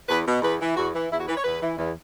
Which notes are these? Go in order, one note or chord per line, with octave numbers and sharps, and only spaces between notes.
E2 B4
B2
E2 B4
E3
E2 F#4
E3
E2 E4
F#4
E3 B4
C#5
E2 B4
E3
E2